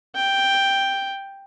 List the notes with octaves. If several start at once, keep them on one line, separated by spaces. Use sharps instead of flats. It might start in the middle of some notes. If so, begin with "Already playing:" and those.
G5